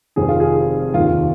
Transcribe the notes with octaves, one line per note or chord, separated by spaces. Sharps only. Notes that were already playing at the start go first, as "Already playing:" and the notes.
F1 F2 D#3 G#4
F4
G#4
F1 D#2 D#3 F4